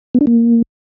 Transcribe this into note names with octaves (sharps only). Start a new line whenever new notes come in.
B3
D4
A#3